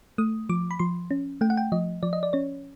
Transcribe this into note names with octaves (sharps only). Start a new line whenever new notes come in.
A3 D#6
F3 D6
B5
F3 C6
C#4
A3 G5
F#5
G5
F3 D#5
F3 D5
D#5
D5
C#4 C#5